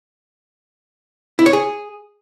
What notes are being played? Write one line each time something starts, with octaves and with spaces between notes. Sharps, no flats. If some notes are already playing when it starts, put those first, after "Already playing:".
E4
C#5
G#4